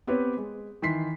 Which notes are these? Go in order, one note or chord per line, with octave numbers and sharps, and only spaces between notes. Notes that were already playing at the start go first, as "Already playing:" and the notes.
B3 C4 G4 B4 C#5
G#3
D#3 E3 C6 B6 C7